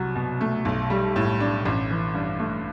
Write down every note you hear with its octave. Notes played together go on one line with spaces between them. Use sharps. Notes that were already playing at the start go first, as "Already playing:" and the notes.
Already playing: C2 F#3
B2
A3
B1
G3
A2
D4
A1
E3
G2
A3